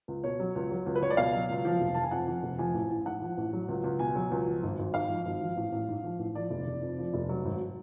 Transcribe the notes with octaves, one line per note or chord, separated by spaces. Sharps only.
C#2
B2 C#5
F#3
C#2
F#3
C#2
B4
C#2 C#5
D5
B2 F5
F#3
C#2
F3
F1
F1 A5
G#5
F2 F#5
F3
F1
F3 G#5
A1
A1
G#2 F#5
F3
A1
F#3
C#2
C#2
B2 G#5
F#3
C#2
F3
G#1
G#1
G#2 F5
F3
G#1
F3
A1
A1
G#2
F3
A1
F3 D5
F1
F1
F2
F3
F1
F#3
G#1